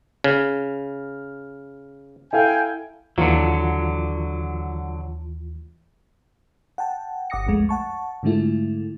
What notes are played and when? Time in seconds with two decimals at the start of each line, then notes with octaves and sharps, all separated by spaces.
0.24 C#3 F6
2.33 E4 A4 F5 G5 G#5
3.18 D#2 D3 E3 F#3 F4
6.78 F#5 G5 A5
7.30 G1 F#5 D6 D#6 A#6 C#7
7.47 B1 F2 G#3 A3
7.69 F#5 A5 C#6
8.23 G#2 D3 G#3 A3 E4 F4